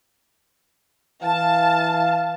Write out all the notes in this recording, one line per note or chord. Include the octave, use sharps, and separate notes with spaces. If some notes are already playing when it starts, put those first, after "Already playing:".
E3 F5 A5